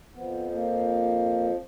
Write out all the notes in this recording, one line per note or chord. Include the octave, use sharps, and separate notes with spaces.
F2 F3 B3
A#3